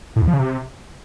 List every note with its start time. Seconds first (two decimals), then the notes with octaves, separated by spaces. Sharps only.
0.16 A2
0.22 E2
0.28 F3
0.33 C#3
0.39 C3